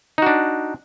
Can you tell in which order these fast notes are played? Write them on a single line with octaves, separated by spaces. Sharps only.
D#4 F#4 D4